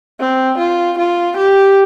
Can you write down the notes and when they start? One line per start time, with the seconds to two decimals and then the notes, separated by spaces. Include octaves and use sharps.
0.20 C4
0.59 F4
0.99 F4
1.38 G4